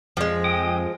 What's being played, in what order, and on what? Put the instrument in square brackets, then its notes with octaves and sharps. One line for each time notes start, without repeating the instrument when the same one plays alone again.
[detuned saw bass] F2 [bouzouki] F3 G#3
[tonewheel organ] G5 D#6